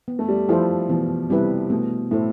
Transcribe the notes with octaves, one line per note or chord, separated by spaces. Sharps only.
B3
A3
G3
F3 E4 A4 C5
B2 E3
C3 G3 C4 E4 B4
B2 A3
A2 E4 A4 C5